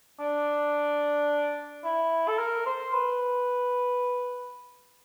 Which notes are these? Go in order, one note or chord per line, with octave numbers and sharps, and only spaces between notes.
D4
E4
A4
A#4
C5
B4